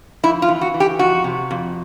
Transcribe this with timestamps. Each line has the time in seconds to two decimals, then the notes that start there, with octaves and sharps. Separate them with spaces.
0.23 F2 E4
0.42 F4
0.48 E3
0.61 F#4
0.74 E3
0.80 G4
0.99 F2 F#4
1.24 C3
1.51 F2